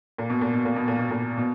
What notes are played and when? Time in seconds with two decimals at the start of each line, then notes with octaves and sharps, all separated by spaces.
0.18 A#2
0.30 B2
0.41 A#2
0.54 B2
0.65 A#2
0.76 B2
0.88 A#2
0.98 B2
1.11 A#2
1.38 B2